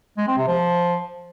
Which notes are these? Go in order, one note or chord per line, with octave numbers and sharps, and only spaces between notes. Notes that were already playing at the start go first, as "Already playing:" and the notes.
G#3
C4
C3
F3